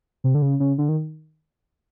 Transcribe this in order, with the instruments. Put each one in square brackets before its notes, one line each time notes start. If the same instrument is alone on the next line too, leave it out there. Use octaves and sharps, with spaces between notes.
[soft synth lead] C3
D3
C#3
C#3
D3
D#3